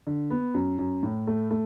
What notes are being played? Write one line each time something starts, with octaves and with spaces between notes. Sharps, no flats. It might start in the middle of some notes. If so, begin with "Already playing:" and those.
D3
B3
F#2
F#2
A2
A3
A3